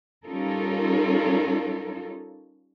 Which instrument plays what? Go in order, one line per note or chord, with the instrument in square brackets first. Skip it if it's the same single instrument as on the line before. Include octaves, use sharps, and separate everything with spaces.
[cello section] G3 C#4 D#4 F4 A4 A#4